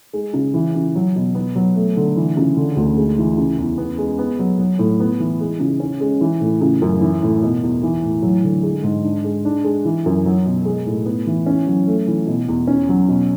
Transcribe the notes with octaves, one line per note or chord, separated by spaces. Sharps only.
G#3
C#3
E3
C#3
F#3
B2
B3
F#3
A3
D3
E3
C#3
D3
D2
G#3
E3
C#3
E2
B3
G#3
B3
F#3
F#3
A2
B3
E3
G#3
C#3
C#4
G#3
E3
A2
C#3
F#2
E3
A2
B2
E2
E3
A2
F#3
D3
G#3
G#2
D4
G#3
D4
G#3
E3
F#2
F#3
B2
G#3
A2
B3
E3
C#4
F#3
A3
E3
B2
E2
C#4
F#3
B2